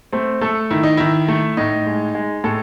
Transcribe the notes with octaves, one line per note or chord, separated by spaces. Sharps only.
A3 C4
A3 A4
D#3 E4
D#4
D#3 E4
A3
A2 D#4
G#3
G#3
A2 A4